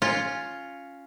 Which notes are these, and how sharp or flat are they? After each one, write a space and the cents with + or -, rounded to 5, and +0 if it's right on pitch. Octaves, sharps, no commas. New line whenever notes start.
C#4 +0 F4 +0